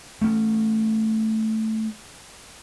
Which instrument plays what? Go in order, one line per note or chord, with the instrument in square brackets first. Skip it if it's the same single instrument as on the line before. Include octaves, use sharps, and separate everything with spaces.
[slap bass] A3 C#4